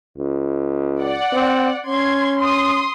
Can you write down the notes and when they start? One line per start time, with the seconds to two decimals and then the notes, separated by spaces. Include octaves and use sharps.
0.18 C#2
1.00 D5 F#5
1.33 C4
1.86 C#4 C6 G#6
2.39 C6 D#6